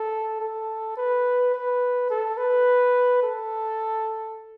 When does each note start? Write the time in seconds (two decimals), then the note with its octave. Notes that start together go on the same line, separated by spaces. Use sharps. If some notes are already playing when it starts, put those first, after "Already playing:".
Already playing: A4
0.41 A4
0.97 B4
1.54 B4
2.10 A4
2.38 B4
3.23 A4